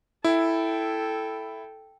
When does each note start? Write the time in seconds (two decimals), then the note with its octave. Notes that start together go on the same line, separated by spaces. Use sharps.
0.24 E4 A4 G5